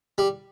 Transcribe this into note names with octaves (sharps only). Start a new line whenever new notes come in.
G3